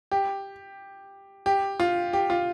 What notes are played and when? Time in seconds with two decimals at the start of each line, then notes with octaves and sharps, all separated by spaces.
0.11 G4
1.46 G4
1.80 F4
2.13 G4
2.30 F4